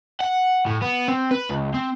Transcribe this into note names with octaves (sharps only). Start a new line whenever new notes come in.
F#5
A2
B3
C4
B4
C#2
C4